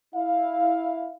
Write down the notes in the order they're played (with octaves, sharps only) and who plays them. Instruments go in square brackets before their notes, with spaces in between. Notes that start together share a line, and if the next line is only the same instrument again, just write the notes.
[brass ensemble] E4 F5